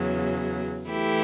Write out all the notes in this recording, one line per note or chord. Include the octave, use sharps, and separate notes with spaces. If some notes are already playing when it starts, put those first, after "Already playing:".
Already playing: E2 C#3 F#3
E3 A3 E4 G4